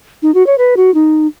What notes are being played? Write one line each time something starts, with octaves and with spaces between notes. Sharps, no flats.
D#4
F#4
C#5
B4
F#4
D#4